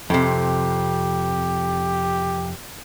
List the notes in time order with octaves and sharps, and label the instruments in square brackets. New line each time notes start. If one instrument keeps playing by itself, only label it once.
[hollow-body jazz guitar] F2 C3 [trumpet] G4